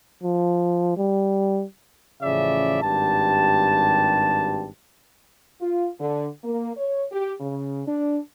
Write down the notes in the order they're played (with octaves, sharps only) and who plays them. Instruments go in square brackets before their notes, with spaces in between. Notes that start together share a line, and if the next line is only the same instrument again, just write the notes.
[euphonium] F3
G3
[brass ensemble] A1 C#3 F3 D5 E5
G#1 G2 G4 A5
[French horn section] F4
D3
A#3
C#5
G4
C#3
D4